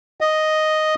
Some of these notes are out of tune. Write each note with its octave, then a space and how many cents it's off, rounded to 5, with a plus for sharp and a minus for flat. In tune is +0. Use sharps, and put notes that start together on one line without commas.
D#5 +0